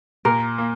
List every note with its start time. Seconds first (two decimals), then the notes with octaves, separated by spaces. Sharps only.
0.25 A#2 A#4
0.58 A#3